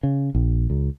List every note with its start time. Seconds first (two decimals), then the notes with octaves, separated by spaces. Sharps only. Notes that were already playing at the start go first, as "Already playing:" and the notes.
0.03 C#3
0.35 A#1
0.70 C#2